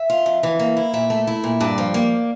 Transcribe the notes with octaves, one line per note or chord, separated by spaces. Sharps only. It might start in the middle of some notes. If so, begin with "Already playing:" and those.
Already playing: E5
F4
F2
E3
A#3
E4
A#2 E5
A3
E4
A#2
G2 D5
F3
A#3